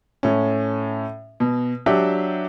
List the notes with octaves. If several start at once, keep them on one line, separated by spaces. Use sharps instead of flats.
A2 C#4
B2
F#3 D4 G4 E5